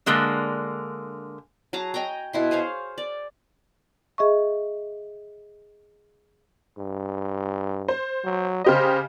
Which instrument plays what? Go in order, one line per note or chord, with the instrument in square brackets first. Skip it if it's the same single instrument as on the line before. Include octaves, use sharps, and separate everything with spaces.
[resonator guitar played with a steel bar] D3 G#3 A#3 D4
[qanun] F#3 G#4 A5 A#5
D#5 G5 G#5 A#5
B2 E4 C6
G#4 C5 C#5 F5
D5
[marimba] G#4 D#5 E5 C#6
[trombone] G2
[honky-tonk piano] C5
[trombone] F#3
[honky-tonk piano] C#3 G4 D#5 [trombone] C5